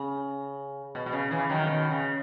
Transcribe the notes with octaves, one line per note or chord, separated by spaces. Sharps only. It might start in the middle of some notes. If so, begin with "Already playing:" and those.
Already playing: C#3
B2
B2
C#3
C#3 E3
D#3 F#3
B2 D#3
C#3